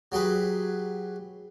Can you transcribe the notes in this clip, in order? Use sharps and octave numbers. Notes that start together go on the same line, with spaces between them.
F#3 G4 G#4 B4